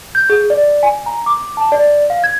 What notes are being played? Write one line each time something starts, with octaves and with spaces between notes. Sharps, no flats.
G6
G#4
D5
G#5
A#5
D6
A5
D5
F5
G#6